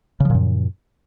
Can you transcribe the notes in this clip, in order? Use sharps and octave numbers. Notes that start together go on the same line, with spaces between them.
F#2 A#2 C#3 F3